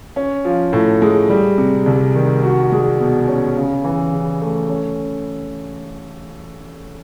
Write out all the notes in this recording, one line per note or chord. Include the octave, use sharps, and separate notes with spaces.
C#4
F3
A2
G#3
G3
C3
C2
D#3
F#4
G#3
B2
C#4
C#3
E3
C#3
A3
C#4